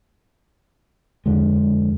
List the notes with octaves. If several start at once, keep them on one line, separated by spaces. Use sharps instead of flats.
F2 D3 G#3